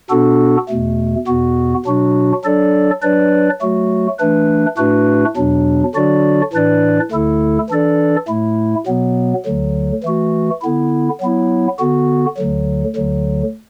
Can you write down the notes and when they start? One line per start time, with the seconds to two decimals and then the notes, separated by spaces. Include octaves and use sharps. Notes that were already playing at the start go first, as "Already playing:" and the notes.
0.10 B2 B3 D4 F#4 A4
0.69 E2 B2 A3
1.27 E2 B2 B3 F#4
1.86 B2 F#3 D4 F#4
2.44 F#3 D4 A4 D5
3.03 F#3 D4 B4 D5
3.61 F#3 A3 F#4
4.19 E3 A3 D4 B4
4.78 A2 A3 D4 F#4 B4
5.36 E2 B2 F#3 D4
5.95 D3 F#3 D4 F#4 D5
6.53 A2 E3 D4 B4 D5
7.11 D2 D3 A3 E4 A4
7.70 E3 D4 A4 D5
8.28 A2 A3 E4
8.87 B2 F#3 B3
9.45 D2 D3 F#3
10.03 E3 A3 F#4
10.62 D3 B3 E4
11.20 F#3 B3 E4
11.79 D3 B3 F#4
12.37 D2 D3 F#3
12.96 D2 D3 F#3